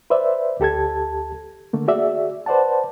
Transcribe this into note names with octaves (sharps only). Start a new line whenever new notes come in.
B4 C5 D5 E5
D2 G4 A4 A5 G#6
D3 A3 A#3
F#4 G#4 D5 E5
B4 C5 D5 F#5 A5